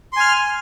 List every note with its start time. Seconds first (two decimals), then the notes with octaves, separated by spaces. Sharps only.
0.13 C6
0.16 G#5
0.20 F6